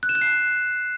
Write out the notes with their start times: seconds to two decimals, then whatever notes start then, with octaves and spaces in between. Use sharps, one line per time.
0.03 F#6
0.09 E7
0.15 F#6
0.21 C7